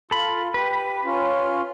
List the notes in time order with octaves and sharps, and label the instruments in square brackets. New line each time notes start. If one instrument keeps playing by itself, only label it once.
[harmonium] F4 [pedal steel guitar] A4 B5
[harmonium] G4 [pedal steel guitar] B4
[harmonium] C#4 F4